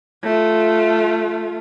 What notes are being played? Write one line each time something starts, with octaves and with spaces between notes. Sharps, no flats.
A3 F4